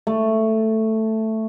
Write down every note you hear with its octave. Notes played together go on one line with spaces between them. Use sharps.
A3